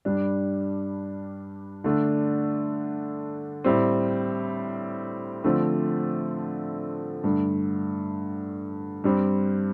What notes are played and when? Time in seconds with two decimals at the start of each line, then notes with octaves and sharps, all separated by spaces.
0.05 G2 G3 D4
1.84 D3 A3 D4
3.64 A2 G3 C4
5.44 D3 F3 A3 C4
7.24 G2 D3 A3
9.04 G2 G3 C4